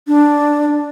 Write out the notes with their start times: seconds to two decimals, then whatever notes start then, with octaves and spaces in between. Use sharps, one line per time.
0.08 D4